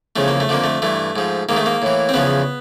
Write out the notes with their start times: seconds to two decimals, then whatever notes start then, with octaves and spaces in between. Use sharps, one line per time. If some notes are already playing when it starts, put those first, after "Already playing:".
0.16 E2 C#3 F3 A3
0.28 A#3
0.40 A3
0.49 F2 D3 F3 A#3
0.64 A3
0.82 G2 E3 A3
1.16 G#2 F3
1.49 G#2 D#3 A#3
1.57 A3
1.66 A#3
1.82 A2 E3
2.09 C4
2.14 E2 C#3 F3 B3